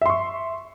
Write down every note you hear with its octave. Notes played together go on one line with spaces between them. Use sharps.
E5 C6 C#6